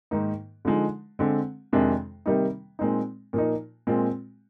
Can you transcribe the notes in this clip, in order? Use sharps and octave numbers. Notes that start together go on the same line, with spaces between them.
G#2 D#3 A#3 D#4
D3 F3 G#3 D#4
D3 G#3 C4
F2 C3 D#3 G#3 D4
C3 D#3 G3 A#3 D#4
A#2 G#3 C4 D#4
A#2 F3 A#3 D#4
A#2 G#3 C4 F4